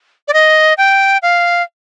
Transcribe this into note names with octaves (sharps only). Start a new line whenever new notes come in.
D5
D#5
G5
F5